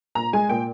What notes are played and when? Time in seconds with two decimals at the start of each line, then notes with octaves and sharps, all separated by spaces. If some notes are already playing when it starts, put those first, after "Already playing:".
0.15 A#2 A#5
0.33 G#3 G#5
0.49 A#2 G5